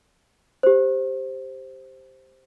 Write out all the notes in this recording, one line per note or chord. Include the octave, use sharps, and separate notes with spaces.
G4 C5